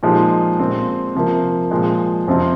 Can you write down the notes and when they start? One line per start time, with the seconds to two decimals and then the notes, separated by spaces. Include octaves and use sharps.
0.03 A#2 F3 G#3 D#4 G4
0.60 A#2 G#3 C4
1.15 C3 F3 A#3
1.71 A#2 F3 G#3
2.28 F2 C3 F3 C4 F4